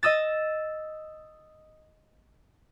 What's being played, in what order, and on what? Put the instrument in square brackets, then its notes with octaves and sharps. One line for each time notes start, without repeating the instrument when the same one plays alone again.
[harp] D#5 D#6 E6 A6